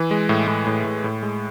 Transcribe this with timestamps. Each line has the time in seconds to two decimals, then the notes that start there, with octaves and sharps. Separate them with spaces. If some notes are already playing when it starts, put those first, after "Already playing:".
Already playing: E3
0.11 G#3
0.29 A2
0.48 A2
0.67 A2
0.84 A2
1.04 A2
1.23 G#3